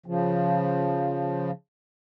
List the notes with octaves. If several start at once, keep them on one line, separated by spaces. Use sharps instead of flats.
C#3 F3